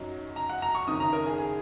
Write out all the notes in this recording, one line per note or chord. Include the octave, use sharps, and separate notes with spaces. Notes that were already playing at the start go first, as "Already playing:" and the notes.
Already playing: F#2 F#3 D#4
A#5
F#5
A#5
C#6
F#1 F#2 D#3 D#6
A#5
A#4
G#4
G#4